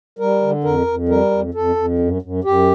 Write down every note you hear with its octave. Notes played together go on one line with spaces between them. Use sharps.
G3 A#4
D3
F2 A#4
F2
G3 A#4
F2
F2 A4
F2
F#2
F#2
F#2 G4